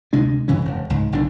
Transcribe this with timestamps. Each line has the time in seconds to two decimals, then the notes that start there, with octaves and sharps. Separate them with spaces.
0.13 D2 C3 G#3 D4
0.48 G2 C#3 E3 C#4
0.65 E1
0.90 C#2 G#2 C#3
1.12 F#1 B1 D3 D4